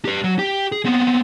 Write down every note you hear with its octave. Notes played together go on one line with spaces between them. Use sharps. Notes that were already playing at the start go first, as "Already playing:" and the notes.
G4 B4
F#3
G4 G5
G#4
B3 C4